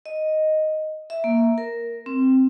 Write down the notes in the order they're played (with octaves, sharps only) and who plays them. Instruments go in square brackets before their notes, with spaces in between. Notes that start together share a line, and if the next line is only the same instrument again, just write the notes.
[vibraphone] D#5
E5
A#3
A#4
C4